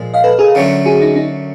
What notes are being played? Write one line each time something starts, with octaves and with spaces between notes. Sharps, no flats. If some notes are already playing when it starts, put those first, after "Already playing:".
Already playing: A#2 F3 G#3
D#5 F5
A4 B4
G#4 A#4
F#2 D3 F#3 A3
F#4 G#4
D#4
D#4